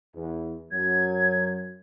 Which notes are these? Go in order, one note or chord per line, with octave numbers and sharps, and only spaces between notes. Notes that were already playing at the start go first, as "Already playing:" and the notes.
E2
F#2 F#3 G#6